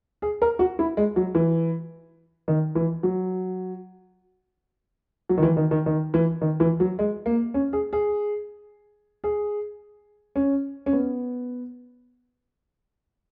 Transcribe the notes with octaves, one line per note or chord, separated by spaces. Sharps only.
G#4
A#4
F#4
E4
G#3
F#3
E3
D#3
E3
F#3
F#3
D#3
E3
D#3
D#3
D#3
E3
D#3
E3
F#3
G#3
A#3
C#4
G#4
G#4
G#4
C#4
C#4
B3